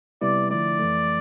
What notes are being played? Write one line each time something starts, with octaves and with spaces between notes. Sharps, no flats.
C3 G3 B3 E4 B4 D5
D3 F3 A3 E4 D5
F2 E3 A3